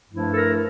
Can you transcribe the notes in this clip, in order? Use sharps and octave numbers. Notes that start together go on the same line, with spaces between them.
G2 F3 A3 E4
A4
A#4